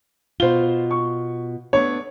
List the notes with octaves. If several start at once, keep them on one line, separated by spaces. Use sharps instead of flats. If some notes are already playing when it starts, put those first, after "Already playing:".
B2 F4 C5 G7
C#6
A3 B3 D4 C#5